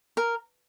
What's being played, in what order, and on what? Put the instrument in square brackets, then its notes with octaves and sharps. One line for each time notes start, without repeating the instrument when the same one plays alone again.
[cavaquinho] A#4